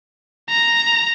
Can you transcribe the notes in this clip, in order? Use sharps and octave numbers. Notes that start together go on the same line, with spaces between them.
A#5